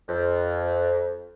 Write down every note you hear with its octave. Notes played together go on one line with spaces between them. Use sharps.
F2